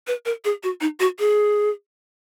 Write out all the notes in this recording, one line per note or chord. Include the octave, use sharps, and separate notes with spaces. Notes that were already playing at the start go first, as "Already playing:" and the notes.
B4
A#4
G#4
F#4
D#4
F#4
G#4